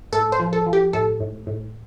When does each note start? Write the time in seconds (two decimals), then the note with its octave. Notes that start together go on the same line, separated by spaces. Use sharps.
0.12 A2 A4
0.32 C5
0.39 F3
0.53 A4
0.66 F3
0.73 G4
0.93 A2 A4
1.20 A2
1.47 A2